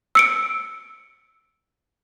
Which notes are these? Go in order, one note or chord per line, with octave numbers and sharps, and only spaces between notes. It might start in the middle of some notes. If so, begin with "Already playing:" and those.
E6 C#7 D7